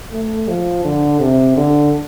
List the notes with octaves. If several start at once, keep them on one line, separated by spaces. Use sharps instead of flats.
A3
F3
D3
C3
D3